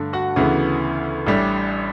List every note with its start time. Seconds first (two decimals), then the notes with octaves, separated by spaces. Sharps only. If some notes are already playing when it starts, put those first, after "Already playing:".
Already playing: G2 D3 A3
0.13 F#4 F#5
0.36 D2 C#3 E3 B3
1.27 A1 A2 G3 D4